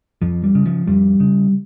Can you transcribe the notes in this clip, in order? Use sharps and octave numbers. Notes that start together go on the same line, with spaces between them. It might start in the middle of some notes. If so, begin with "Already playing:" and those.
F2 F3
G3
C#3
F3
F2 G3
C#3